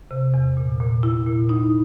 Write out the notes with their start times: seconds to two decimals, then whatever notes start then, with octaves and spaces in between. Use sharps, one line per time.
0.11 C3
0.34 E2
0.57 A#2
0.80 A#2
1.03 E4
1.26 A#2
1.49 D#4